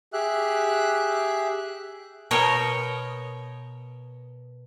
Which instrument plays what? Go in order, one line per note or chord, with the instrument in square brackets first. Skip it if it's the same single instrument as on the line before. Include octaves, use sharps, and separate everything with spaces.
[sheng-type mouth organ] G4 G#4 E5 F#6
[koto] B2 A#4 C#5 D#5 G5